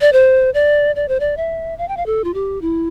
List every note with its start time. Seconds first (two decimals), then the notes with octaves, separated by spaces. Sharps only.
0.01 D5
0.13 C5
0.54 D5
0.96 D5
1.08 C5
1.20 D5
1.37 E5
1.78 F5
1.88 G5
1.97 F5
2.06 A4
2.24 F4
2.34 G4
2.62 E4